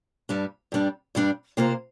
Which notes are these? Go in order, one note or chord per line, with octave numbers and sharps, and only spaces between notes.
G2 G3 D4
G2 G3 D4
G2 G3 D4
C3 A#3 F4 C5